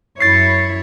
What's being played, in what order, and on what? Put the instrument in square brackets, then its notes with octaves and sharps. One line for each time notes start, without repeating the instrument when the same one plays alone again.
[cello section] F#2 E4 C#5 [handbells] A6 C7